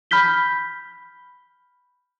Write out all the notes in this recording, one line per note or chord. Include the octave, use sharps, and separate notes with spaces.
B5 F6 G6 B6 G7